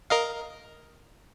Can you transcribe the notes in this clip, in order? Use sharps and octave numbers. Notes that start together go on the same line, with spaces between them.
A#4 D#5 F5